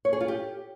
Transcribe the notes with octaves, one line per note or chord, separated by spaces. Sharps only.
C#5
G#4
F4
G4